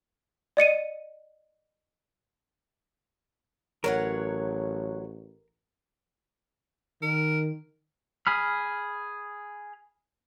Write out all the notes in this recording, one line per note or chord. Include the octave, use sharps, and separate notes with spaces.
D5 D#5 C#7 D#7
A1 F#3 A#4 C#5 F#5
D#3 A#4
G#4 B5 F6